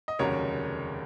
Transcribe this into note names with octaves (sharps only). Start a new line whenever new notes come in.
D#5
F1 D#2 C#3 F#3 A#4 C#5